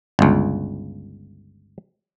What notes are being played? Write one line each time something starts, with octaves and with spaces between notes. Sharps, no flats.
G1 C#2